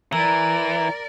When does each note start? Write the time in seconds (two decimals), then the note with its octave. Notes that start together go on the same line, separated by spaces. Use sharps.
0.13 E3 A#4 D5 A#5